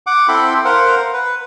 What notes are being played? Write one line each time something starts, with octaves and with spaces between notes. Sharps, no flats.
F#5 D6
C4 E4 A4 G5 B5 C6
A#4 C5 F5 F#5
B4